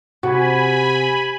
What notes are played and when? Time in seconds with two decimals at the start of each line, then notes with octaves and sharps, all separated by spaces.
0.23 C3 F#4 G#5 B5